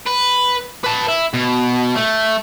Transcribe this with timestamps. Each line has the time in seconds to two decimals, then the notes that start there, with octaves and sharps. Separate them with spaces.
0.07 B4
0.84 B4 A5
1.08 E4
1.34 B2
1.96 A3